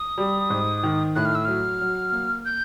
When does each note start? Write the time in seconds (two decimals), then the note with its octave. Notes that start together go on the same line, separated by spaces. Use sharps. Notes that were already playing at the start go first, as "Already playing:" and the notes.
Already playing: D#6
0.18 G3
0.50 G#2
0.83 D#3
1.16 A2 F#6
1.25 F6
1.35 E6
1.45 F#3 F6
1.81 F#3
2.12 A#3
2.45 G6